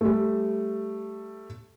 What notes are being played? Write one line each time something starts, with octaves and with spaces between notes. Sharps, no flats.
G3 A3